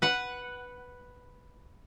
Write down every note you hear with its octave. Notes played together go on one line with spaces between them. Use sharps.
B4 F#5